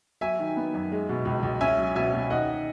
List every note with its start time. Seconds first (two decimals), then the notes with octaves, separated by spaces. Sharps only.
0.21 F#3 E5 G#5
0.40 D#3
0.56 B3
0.74 F#2
0.92 G#3
1.09 B2
1.25 C#2
1.43 C#2
1.61 C#4 E5 G#5
1.78 F#3
1.96 B2 E5 G#5
2.13 B2
2.30 D#3 D#5 F#5